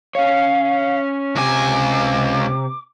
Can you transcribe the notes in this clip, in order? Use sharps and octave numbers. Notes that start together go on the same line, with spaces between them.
C#4 C#5 F5
C#2 C3 G#5 D6